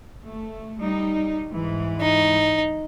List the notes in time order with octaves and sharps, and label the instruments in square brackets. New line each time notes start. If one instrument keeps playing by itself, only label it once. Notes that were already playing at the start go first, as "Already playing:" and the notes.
[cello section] A3
G3 D#4
G#2 E3
[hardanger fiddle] D#4